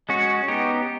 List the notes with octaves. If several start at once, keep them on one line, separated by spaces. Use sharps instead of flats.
G#3 C#4 F#4
B3 D#4 G4